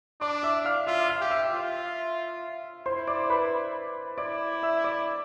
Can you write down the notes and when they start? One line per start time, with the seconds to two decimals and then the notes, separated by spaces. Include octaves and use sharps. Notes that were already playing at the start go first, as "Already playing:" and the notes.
0.21 D4 D5 D6
0.43 E5 E6
0.65 F5 F6
0.87 F4 E5 E6
1.09 F5 F6
1.20 G4
1.31 E5 E6
1.53 F4
2.86 E4 C5 C6
3.07 D5 D6
3.30 B4 B5
4.18 E4 D5 D6
4.63 E5 E6
4.84 D5 D6